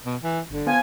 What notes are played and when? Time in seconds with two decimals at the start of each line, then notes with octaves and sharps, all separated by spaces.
0.05 B2
0.22 E3
0.50 G1 D3
0.66 F3 B3 G#5